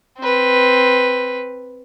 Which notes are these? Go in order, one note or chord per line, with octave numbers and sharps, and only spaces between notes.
C4 B4